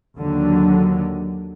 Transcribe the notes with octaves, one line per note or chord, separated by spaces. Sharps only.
D#2 D3 F#3